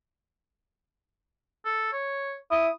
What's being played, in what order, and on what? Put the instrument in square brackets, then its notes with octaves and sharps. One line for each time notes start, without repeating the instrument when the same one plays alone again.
[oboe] A4
C#5
[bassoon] E4 [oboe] D#6